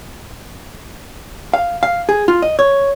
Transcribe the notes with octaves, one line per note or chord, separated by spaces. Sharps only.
F5
F5
G#4
F4
D#5
C#5